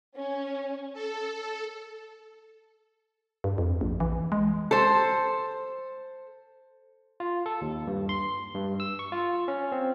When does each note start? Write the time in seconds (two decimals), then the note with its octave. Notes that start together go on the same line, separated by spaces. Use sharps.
0.17 C#4
0.93 A4
3.44 G2
3.58 F2
3.81 A#1
4.00 E3
4.32 G#3
4.71 A4 C5
7.20 F4
7.46 A4
7.61 D#2
7.87 G2
8.09 C6
8.55 G2
8.80 E6
8.99 C#6
9.12 F4
9.48 C#4
9.72 C4